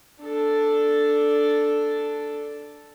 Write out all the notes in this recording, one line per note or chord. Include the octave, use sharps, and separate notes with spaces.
D4 A4